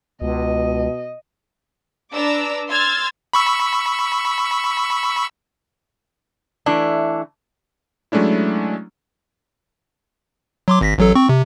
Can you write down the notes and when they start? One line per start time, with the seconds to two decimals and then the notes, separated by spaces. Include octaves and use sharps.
0.22 C#2 B2 D#5
2.12 D4 B4 A#5 D6 E6
2.68 C6 E6 F6 G#6 A6
3.33 B5 C#6 E6
6.66 E3 A3 D4 E4
8.12 F#3 G#3 A3 C#4 D4 E4
10.68 F#3 C6 D6
10.81 G#1 A#6 B6
10.98 A1 F#3 A4
11.15 C4 C#6
11.29 C3